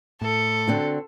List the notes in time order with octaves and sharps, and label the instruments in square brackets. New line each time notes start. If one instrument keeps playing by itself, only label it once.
[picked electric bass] A2 [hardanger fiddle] A4
[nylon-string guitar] D3 C4 F#4